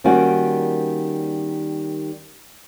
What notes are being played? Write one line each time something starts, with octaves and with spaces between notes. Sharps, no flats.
D#3 G3 A#3 C#4 F#4